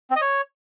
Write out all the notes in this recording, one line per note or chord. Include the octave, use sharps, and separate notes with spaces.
C4
D#5
C#5